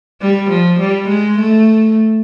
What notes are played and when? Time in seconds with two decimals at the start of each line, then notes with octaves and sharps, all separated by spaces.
0.21 G3
0.50 F3
0.80 G3
1.09 G#3
1.39 A3